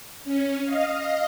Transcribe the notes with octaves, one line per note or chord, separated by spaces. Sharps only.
C#4
D#5 F5